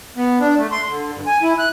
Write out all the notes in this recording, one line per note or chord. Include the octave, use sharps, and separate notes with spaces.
B3
D4
A3
C6
D3
G2
G#5
E4
F#6